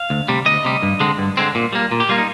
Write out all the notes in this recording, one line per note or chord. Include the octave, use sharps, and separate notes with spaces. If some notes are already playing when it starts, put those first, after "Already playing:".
Already playing: F5
D2
C3 G3
D2 D#5
C3 G3
G2
D3 G#3 C4
G2
D3 G#3 C4
A#2
G3 A#3
A#2
G4
G3 A#3 F4
D#4